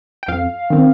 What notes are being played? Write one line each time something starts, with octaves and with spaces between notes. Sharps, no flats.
G5
F2 F5
D#3 C4